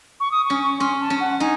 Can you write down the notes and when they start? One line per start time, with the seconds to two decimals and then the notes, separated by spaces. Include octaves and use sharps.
0.20 C#6
0.32 D#6
0.45 C#6
0.50 C#4
0.80 C#4 C6
1.00 A5
1.10 C#4
1.20 F#5
1.40 D#4 G#5